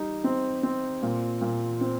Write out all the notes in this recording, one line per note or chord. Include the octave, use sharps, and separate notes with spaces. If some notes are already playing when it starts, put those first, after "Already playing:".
Already playing: G3 D#4
C4
C4
A#2
A#2
C4